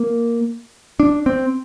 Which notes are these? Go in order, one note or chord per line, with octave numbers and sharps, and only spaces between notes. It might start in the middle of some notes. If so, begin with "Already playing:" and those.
Already playing: A#3
D4
C4